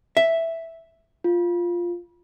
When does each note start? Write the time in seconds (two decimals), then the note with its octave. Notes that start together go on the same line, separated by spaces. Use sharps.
0.17 E5
1.24 F4